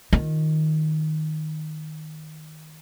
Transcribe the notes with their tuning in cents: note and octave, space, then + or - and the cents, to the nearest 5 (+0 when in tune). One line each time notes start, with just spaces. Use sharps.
D#3 +0 F4 +0